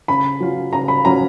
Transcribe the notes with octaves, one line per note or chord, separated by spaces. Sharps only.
C#3 B5
F#3 C#4 F4
C#3 A#5
B5
F#3 C#4 F4 A#5